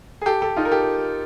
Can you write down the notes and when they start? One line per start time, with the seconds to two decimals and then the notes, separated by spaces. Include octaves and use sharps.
0.22 G#4
0.26 G4 A4
0.42 G4 A4
0.56 D#4 F4
0.65 A#4
0.72 G4 A4